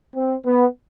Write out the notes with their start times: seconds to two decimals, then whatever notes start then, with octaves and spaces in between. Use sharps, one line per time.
0.15 C4
0.45 B3